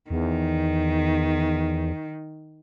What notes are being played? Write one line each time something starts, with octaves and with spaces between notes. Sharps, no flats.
E2 D#3